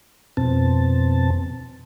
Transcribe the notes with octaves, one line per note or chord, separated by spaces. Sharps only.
F2 B2 C4 A5